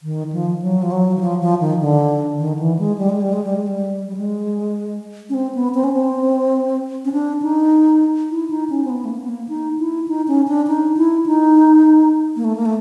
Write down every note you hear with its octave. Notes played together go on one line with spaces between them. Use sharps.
D#3
F3
F#3
F3
F#3
E3
F3
F3
D#3
D3
D#3
E3
G#3
G3
G#3
G3
G#3
G3
G#3
G3
G3
G#3
C#4
C4
B3
C4
C#4
C4
C#4
D4
D#4
E4
D#4
C#4
C4
B3
A3
A#3
B3
A#3
D#4
E4
D#4
C#4
D4
D#4
E4
D#4
A#3
A3
A#3
A3